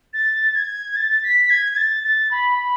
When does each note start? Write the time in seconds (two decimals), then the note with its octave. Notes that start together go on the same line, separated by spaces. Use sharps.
0.13 A6
0.55 G#6
0.96 A6
1.23 B6
1.50 G#6
1.72 G#6
1.77 A6
2.04 A6
2.31 B5
2.58 B5